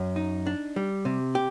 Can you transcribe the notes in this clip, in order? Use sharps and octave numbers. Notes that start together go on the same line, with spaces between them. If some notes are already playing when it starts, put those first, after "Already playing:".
Already playing: F#2
D#4
D4
G3
C3
G4